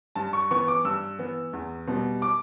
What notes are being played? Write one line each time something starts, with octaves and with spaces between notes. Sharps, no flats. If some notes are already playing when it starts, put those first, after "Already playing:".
G2 A5
C#6
E3 B3 C#6
D6
G2 E6
E3 B3
E2
B2 G3 B3
D6